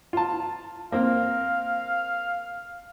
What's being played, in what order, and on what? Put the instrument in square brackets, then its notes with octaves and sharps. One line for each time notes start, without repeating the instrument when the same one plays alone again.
[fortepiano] F4 A5
[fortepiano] A#3 C4 [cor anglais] F5